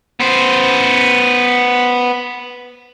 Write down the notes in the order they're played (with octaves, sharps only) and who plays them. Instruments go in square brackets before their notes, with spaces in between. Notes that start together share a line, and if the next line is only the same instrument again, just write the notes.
[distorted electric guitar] B3 C5